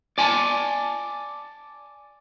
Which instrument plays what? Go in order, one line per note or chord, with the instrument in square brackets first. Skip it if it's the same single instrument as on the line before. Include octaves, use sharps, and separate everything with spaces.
[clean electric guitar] D5 G#5 A5